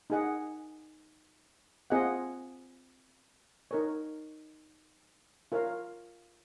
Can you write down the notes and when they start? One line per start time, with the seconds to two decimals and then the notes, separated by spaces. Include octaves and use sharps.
0.10 D#4 G#4 D#5 F#5
1.90 C4 F4 G#4 D#5 F#5
3.71 D#4 A#4 C#5
5.52 F4 A#4 C#5 F5